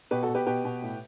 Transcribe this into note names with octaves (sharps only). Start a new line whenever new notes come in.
B2 G4 B4
F#4 A4
B2
G4 B4
B2 G4 B4
B2
A2